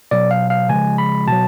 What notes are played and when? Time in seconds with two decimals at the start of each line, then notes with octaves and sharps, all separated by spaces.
0.11 B2 F#3 D5
0.31 F5
0.50 F5
0.69 C#3 F3 G#3 G#5
0.98 B5
1.27 B2 F#3 A5